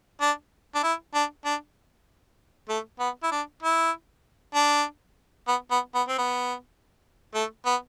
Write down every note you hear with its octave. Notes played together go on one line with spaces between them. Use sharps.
D4
D4
E4
D4
D4
A3
B3
E4
D4
E4
D4
B3
B3
B3
C4
B3
A3
B3